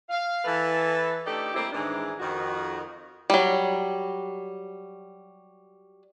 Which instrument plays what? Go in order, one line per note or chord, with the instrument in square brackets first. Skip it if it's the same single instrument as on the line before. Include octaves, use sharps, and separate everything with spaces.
[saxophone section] F5
E3 A4 B4
A3 D4 D#4 G4 A4
G3 A3 A#3 C4 E4 G4
G#2 D#3 E3 G#3 D4 D#4
F2 D#3 F#4
[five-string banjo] F#3 G3